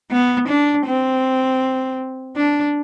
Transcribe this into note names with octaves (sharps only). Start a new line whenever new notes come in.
B3
D4
C4
D4